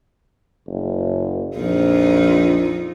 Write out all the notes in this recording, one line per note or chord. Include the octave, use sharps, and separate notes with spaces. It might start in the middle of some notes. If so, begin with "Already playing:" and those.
F#1
A#1 F2 F3 D#4